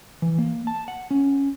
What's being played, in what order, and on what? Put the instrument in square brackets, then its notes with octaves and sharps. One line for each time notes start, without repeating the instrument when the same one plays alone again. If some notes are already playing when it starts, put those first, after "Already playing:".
[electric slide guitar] E3
A#3
A5
F#5
C#4